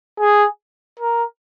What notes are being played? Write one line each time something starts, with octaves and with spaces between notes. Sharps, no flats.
G#4
A#4